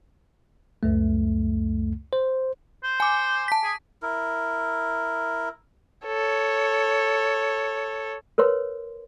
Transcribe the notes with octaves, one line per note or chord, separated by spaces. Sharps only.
C#2 F#2 A3
C5
C5
G#5 D6
A5 B6
G#4
E4 A#4
A4 C#5
A#4 B4 C#5 C6